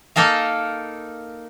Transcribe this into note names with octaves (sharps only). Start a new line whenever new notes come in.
A#3 D#4 A4 A#4 F5